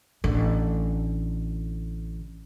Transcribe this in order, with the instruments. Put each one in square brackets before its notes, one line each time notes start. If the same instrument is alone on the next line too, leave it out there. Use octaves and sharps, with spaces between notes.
[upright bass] A1 D3